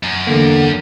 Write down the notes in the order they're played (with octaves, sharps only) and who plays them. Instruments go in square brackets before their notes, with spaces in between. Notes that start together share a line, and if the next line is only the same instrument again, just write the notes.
[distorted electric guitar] F#2
[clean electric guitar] E2 D3 A#3